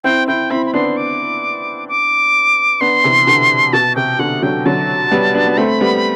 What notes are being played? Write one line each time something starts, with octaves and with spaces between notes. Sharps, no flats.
C4 E4 G5
C4 E4 G5
C4 E4 B5
B5
B3 D4 C6
D6
D6
B3 D4 C6
C3 E3
B2 D3
B2 A5
C3 G5
B2 D3 F#5
D3 F#3 G5
D3 F#3 A5
G3 B3
B3 D4
B3
A3 C4 B5
G3 B3